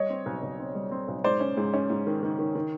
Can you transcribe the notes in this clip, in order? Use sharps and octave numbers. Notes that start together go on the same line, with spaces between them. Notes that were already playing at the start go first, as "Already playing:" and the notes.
Already playing: G3 C#5 D#5
C4
B1
B1
C4
G3
C4
B1
G#2 C5 D5
C#4
G#2
C#4
G#2
D#3
D#3
D#3
D#3